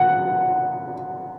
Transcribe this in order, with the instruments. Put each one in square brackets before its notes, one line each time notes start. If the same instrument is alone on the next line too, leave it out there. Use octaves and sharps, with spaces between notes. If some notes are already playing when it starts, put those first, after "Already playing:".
Already playing: [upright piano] F#5